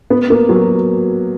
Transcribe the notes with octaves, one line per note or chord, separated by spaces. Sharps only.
B3
A#3
F#3